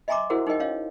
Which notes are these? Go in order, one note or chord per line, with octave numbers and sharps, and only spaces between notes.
D#5 E5 G#5 A#5 C6 D6
E4 F#4 G#4 A#4 C5 F#5
D#4 G#4 A#4 D#5 G5
C#4 C#5 D#5 F5